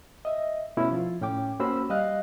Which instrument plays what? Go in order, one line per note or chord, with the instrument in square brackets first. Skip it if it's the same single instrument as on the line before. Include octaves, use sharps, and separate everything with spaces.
[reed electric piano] D#5 E5
B2 A3 C#4 E4
F3 F4
A2 C#4 G5 D6
A#3 C#4 F#4 C5 B5 E6
G3 D#5 F5 F#6